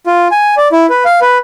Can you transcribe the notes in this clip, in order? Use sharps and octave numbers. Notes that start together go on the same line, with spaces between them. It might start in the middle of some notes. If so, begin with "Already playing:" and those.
F4
G#5
D5
E4
B4
F5
B4